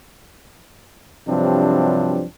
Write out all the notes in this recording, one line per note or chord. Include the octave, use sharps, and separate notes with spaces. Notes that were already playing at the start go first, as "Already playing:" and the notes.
G2 C3 F3 F#3 C4 D4